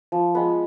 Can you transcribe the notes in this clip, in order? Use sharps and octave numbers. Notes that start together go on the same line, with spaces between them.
F3
G#3 B3